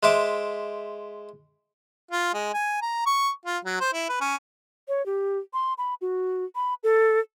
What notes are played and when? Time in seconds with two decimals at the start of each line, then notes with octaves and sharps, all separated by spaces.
0.03 G#3 C5 E5 D6
2.11 F4
2.34 G#3
2.53 G#5
2.82 A#5
3.06 C#6
3.46 F4
3.65 F#3
3.80 C5
3.93 E4
4.09 B4
4.20 C#4
4.88 C#5
5.06 G4
5.53 C6
5.78 B5
6.01 F#4
6.55 B5
6.83 A4